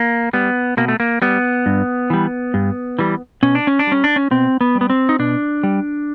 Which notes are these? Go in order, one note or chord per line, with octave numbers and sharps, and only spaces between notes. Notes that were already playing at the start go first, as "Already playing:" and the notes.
Already playing: A#3
G3 B3
B2 A#3
A3
A#3
G3 B3
G2
E3 G3
G2
E3 G3
B2 C#4
D4
C#4
D4
G3 C#4
D4
C#4
B2 C4
B3
G3
B3
C4
D#4
B2 D4
G3